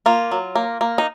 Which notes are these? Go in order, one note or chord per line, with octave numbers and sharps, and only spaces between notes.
A#3 F4
F#3
A#3
A#3
D#4